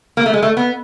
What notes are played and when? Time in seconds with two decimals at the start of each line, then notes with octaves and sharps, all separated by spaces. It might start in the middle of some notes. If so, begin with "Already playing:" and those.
0.17 A#3
0.26 A3
0.34 G#3
0.43 A3
0.57 B3